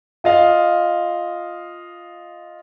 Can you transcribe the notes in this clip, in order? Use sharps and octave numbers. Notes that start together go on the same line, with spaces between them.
F4 D#5 F5